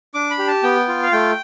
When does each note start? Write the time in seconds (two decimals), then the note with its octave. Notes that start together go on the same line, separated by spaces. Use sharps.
0.14 D4 D6
0.30 B5
0.39 G4
0.47 A5
0.63 B3 G5
0.88 F4
1.03 F5
1.12 A3 G5